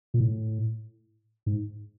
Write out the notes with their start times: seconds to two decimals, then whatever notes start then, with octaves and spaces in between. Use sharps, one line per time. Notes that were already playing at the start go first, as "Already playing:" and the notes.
0.14 A#2
0.20 A2
1.46 G#2